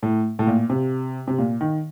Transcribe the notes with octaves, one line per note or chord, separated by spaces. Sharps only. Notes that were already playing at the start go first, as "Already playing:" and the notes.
A2
A2
A#2
C3
C3
A#2
D#3